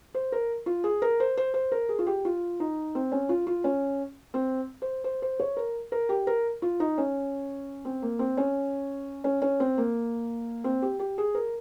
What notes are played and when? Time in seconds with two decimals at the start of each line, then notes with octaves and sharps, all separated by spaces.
0.14 C5
0.32 A#4
0.66 F4
0.84 G#4
1.02 A#4
1.20 C5
1.37 C5
1.54 C5
1.72 A#4
1.89 G#4
1.99 F4
2.07 G4
2.25 F4
2.60 D#4
2.95 C4
3.12 C#4
3.29 F4
3.47 F4
3.64 C#4
4.34 C4
4.82 C5
5.04 C5
5.22 C5
5.40 C#5
5.57 A#4
5.92 A#4
6.09 G4
6.27 A#4
6.62 F4
6.80 D#4
6.98 C#4
7.85 C4
8.02 A#3
8.19 C4
8.37 C#4
9.24 C#4
9.42 C#4
9.60 C4
9.77 A#3
10.64 C4
10.82 G4
10.99 G4
11.18 G#4
11.35 A#4